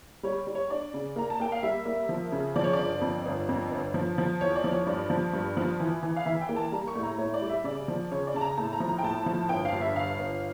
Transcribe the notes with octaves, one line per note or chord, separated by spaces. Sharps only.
G3 C#5
G3
C#5
D4 D5
C#3
A#3 A#5
A5
A#3 G5
F5
G3 E5
A#3
F3
C#3
F3 D5
C#5
G1 D5
F2
G1
F2
G1
F3
F3
E2 C#5
D5
F3
C#5
G2 D5
F3
G2
F3
E3
E3
F5
E3 E5
G5
A#3
A5
G3 A#5
C#6
A2
A#5
A2 C#5
D5
G3
E5
C#3 D5
F3
C#3 C#5
D5
C#3 A5
A#5
A2 A5
A#5
F3
A#5
G5
A2 A5
F3
G1 G5
F5
G2
E5
G1 F5
G1